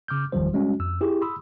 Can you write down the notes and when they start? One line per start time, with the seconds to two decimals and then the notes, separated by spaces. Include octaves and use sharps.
0.08 C#3 D6 F6 G6
0.32 G1 E2 D#3 F3 G3 C5
0.53 G3 G#3 C#4 F#4
0.80 F2 E6
1.01 E4 G4 G#4
1.22 B5 C6 D#6 E6